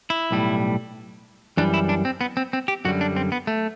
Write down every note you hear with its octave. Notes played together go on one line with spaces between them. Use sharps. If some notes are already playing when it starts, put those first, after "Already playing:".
E4
B1 A2 G3
F#2 E3 G3 D4
E4
D4
C4
B3
C4
C4
G4
F#2 D3 G3 F#4
D4
C4
B3
A3